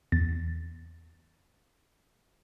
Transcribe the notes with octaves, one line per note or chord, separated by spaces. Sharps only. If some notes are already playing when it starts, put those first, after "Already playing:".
E2 A6